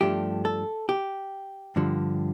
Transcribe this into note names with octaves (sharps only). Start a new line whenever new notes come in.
G2 F3 A3 D4 G4
A4
G4
G2 D3 F3